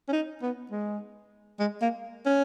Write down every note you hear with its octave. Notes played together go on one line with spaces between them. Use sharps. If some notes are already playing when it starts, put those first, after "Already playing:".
C#4
D#4
B3
G#3
G#3
A#3
C#4